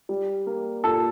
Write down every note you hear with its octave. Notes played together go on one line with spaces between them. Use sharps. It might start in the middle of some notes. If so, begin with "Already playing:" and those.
G3
A#3
A#2 A4